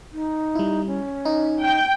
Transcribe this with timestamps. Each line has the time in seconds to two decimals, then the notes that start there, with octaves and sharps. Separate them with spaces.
0.12 D#4
0.55 G3 E4
0.86 C#4
1.25 D#4
1.62 G5